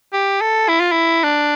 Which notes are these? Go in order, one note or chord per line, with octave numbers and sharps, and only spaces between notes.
G4
A4
E4
F4
E4
D4